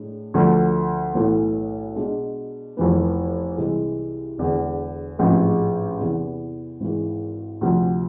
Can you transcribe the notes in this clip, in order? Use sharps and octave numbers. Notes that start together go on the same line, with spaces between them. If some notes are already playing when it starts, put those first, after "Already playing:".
Already playing: A2 G#3 D4
D2 D3 F3 A3
B1 A2 E3 A3
B2 G#3 D4
F1 F2 E3 B3
C2 C3 E3 G#3
E1 E2 D3
A1 G#2 F3 G#3 C4
E2 C3 E3 B3
G#1 G#2 E3
D2 C3 F3